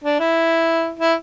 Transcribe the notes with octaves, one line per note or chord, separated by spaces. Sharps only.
D4
E4
E4